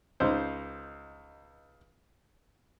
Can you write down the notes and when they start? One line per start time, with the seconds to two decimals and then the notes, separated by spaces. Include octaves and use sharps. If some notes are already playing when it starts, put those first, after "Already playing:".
0.20 C#2 D#4 C5